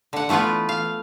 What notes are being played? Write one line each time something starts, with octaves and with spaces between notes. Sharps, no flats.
D3 F#5
E3 A3 B3 F4 B4
F5